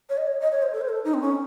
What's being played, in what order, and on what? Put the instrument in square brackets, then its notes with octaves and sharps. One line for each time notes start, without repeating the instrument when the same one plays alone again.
[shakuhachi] C#5
D#5
C#5
D#5
C#5
C5
A4
C5
A4
D#4
C4
C#4